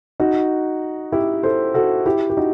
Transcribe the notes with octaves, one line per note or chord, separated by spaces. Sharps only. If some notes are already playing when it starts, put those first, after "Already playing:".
D#4 F#4
E4 G4
A4 C5
F#4 A4
E4 G4
G4
D#4 F#4